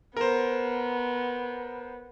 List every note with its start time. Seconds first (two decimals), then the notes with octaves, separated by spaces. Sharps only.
0.17 B3 A#4 C5